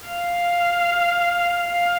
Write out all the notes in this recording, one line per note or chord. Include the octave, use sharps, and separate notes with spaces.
F5
F5